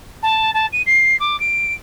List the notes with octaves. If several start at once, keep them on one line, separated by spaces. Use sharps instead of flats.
A5
A5
D#7
C7
D6
D7